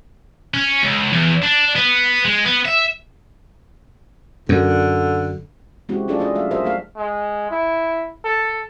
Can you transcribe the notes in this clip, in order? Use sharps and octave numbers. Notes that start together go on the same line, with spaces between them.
C#4
C#2
E2
D4
B3
G#3
B3
E5
F#2 D3
G#3 C4 C#4 E4 F#4 G4
C#4 D4 F4 G#4 A4 D5
D4 G#4 D#5
F#3 A3 E5 F5
F#4 G#4 A#4 C5 D#5 E5
A3 A4 F5
G#3
E4
A4